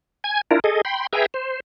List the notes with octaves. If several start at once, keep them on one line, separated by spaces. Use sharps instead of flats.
G#5 G#6
D4 E4 F4 A#4
G#4 A4 D#5
G5 B5 C6
G#4 B4 E5 G5 G#5 A#5
C5